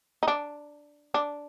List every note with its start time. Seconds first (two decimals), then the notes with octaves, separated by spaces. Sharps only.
0.23 D#4
0.28 D4
1.14 D4